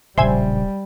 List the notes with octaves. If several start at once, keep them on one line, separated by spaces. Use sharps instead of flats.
D1 A#1 C#3 G3 C5 E5 G#5